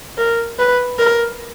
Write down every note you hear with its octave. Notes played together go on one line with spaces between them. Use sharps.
A#4
B4
A#4